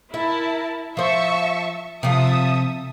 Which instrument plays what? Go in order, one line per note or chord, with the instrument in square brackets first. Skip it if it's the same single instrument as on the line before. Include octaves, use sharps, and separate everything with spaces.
[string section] E4 A#4 A5 [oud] E5
[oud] F3 C5 [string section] E5 A5 C#6
[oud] C3 F3 [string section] A4 E5 D#6